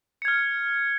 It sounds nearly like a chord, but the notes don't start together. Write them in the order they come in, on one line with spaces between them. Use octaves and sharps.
C#7 G#6 F6